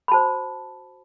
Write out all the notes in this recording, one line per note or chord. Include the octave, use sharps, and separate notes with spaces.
B5
F#4 C5 A5